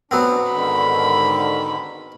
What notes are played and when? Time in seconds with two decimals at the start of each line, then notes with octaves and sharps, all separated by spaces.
0.11 F#3 B3 C4 D4
0.52 G#2 D3 D#3 B5